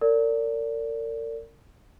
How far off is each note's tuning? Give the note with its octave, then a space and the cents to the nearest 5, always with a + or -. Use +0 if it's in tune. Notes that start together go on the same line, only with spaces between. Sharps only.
A#4 -35 D5 -25